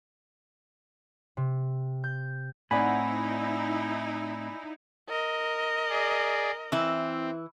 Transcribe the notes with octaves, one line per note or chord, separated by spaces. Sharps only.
C3
G6
A2 C4 D#4 E4 D5 F#5 G#5 B5
A#4 D#5
G#4 D5
E3 C4 E4